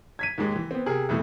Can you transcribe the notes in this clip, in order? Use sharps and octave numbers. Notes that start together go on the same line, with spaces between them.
G#6 B6 D#7
D#2 G#2 G#3
E3
B3 C4
C3 G#4 A#4
C2 F2 B2 E3 A3